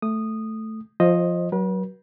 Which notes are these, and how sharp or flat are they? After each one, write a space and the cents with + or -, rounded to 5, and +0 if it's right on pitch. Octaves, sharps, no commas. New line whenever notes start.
A3 +0 D#6 -10
F3 +0 C5 +20 D#5 +0
F#3 +15 B4 -40